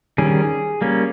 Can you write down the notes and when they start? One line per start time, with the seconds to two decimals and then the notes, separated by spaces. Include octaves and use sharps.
0.18 D#3 G3 C#4 G#4
0.81 G3 A#3 C#4